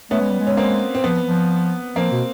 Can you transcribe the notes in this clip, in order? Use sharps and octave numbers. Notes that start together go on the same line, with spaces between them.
A3 B3 C#4
G#3
G3
G#3
C#4
A#3 C4
C4
F3 B3
F3
F3 A#3 C4
B2